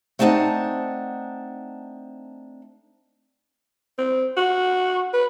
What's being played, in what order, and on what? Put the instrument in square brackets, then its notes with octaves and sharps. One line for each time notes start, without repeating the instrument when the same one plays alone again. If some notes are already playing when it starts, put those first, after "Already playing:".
[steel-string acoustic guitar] A3 C4 D4 D#4 F#5 A5
[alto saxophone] C4
F#4
B4